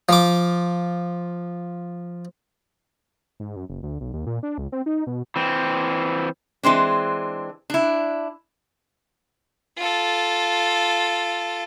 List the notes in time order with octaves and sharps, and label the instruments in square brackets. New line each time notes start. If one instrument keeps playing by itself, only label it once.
[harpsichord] F3 D6
[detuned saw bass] G#2
F#2
F#1
D2
B1
D#2
A#2
D4
C#2
C4
D#4
B2
[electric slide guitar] E3 C4
[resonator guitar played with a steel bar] E3 G#3 C4 D4
D4 E4
[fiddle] F4 A4